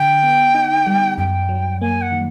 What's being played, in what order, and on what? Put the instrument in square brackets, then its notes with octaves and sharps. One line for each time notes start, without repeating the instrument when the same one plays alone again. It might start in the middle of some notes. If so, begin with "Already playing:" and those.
Already playing: [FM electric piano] D3 [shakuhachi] G5
[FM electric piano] B3
D#4
G3
[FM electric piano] F#2 [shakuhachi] G5
[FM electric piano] F#3
[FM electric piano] A#3 [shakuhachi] G#5
[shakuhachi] F#5
[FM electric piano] D#3